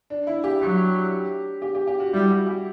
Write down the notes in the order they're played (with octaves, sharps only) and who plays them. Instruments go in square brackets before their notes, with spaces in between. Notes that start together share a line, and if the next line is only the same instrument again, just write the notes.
[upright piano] D4
E4
G4
[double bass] F#3
[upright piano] G4
G4
G4
F#4
[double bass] G3 [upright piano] E4
[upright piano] F#4
G4